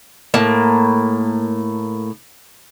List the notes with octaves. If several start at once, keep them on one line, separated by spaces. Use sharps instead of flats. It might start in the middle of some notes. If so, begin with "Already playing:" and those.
A2 A#3 A5